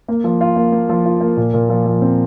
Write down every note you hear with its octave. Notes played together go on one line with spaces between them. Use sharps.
A#3
F3
F4
A#3
A#3
F3
F4
A#3
A#2
A#2
F3
F3
C4